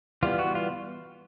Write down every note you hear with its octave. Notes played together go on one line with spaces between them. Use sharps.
E3 G3 B3 F4
F#4
F4